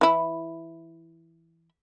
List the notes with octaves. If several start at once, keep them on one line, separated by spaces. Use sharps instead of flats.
E3 E4